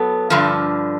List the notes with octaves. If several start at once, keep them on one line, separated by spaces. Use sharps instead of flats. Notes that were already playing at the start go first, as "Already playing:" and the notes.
Already playing: F#3 B3 A4
G2 D3 F3